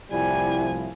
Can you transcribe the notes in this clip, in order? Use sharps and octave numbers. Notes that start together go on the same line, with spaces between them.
C2 A2 F3 G3 E4 G#5